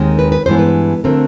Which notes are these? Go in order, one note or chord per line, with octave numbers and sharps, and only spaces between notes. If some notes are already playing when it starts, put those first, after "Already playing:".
Already playing: D#2 D#3 G#3 C4
B4
B4
G2 E3 G#3 B3 C5
B4
D3 F#3 A3 C4 A#4